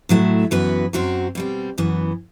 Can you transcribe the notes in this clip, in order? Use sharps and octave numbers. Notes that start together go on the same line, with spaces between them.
A2 F#3 A3 E4
F#2 E3 B3 F#4 B4
F#2 F#3 C4 F#4 C5
B2 G3 C4
F#2 E3 B3